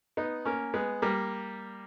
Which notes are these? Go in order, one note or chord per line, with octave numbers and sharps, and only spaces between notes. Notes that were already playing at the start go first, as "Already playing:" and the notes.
B3 D#4
A#3 C#4
G#3 B3
G3 A#3